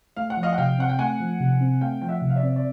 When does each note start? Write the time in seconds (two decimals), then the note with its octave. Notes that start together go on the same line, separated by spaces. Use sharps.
0.17 A3 F5
0.30 F#5
0.37 F3
0.43 D#5 F5
0.53 F#5
0.58 C3 F5 G5
0.78 C4 F#5
0.89 G5
0.99 A3 F#5 G#5
1.20 F3
1.40 C3
1.61 C4
1.81 A3 F5 G5
2.01 F3 G5
2.09 E5 F#5
2.22 C3
2.30 F5
2.36 D5 E5
2.43 C4
2.56 D5